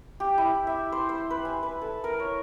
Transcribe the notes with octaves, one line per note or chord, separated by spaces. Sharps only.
G4
E4
E5
C5
C5
B4
G#5
B4
A4
A#4
C#5